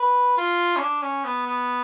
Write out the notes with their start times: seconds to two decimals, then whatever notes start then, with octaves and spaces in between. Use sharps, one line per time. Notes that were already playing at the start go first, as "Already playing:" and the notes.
Already playing: B4
0.37 F4
0.76 C#4
0.81 D4
1.02 C#4
1.24 B3
1.46 B3